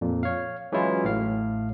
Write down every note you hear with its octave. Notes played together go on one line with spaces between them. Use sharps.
F2 A#2
C#5 F5
E3 F#3 G#3 C#4 E4 F4
A1 A2 F5